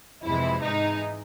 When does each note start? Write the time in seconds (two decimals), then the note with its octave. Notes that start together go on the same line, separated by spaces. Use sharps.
0.24 F2 C3 E3 G#3 E4
0.63 G#2 E3 G#3 D#4